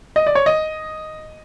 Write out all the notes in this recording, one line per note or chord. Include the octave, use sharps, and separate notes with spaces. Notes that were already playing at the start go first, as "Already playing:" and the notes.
D#5
D5
C#5
D#5